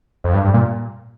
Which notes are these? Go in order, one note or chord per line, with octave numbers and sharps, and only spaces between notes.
F2
G2
G2
A#2